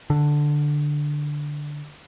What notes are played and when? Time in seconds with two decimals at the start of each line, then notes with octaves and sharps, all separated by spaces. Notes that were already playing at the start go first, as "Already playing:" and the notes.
0.10 D3